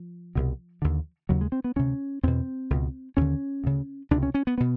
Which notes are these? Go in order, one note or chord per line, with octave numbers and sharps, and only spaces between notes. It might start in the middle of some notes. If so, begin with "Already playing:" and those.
Already playing: F3
C2 B2
D#2 D3
D#2 C#3 F#3
G#3
C4
B3
D2 C3 C#4
E2 B2 C4
C#2 B2
D#2 D3 C#4
D2 C#3
C#2 C3 D4
C#4
C#4
B3
B2 B3